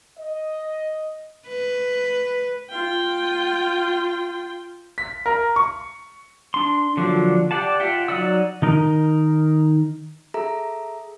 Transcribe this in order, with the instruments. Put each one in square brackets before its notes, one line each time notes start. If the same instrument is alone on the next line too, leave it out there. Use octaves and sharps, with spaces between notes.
[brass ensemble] D#5
[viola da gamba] B4
[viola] F4 G5
[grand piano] B6
A#4
C#6
[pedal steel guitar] D4 C6
D3 F3 F#3 A#3 D4
G4 D5 F#5 A5
F4 E5 F#5 G5
F#3 D#4 D5 F#5 E6
[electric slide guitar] D#3 D#4 A#4
[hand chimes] G#4 A4 E5 A#5